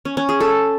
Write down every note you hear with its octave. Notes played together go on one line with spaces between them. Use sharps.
C#4
C#4
G#4
A4